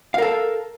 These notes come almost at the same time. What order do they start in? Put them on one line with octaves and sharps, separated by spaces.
F5 A#4 A4